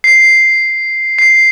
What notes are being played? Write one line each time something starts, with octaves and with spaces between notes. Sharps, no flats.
C7
C7